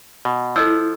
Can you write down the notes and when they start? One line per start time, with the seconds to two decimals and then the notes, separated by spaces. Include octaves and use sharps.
0.25 B2
0.56 F3 E4 A4 D#5 E6